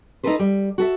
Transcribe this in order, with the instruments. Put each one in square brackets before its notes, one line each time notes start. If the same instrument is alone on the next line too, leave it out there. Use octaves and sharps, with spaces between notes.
[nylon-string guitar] D#4 E4 G4 A4 B4 C5
G3
F#4 A4 E5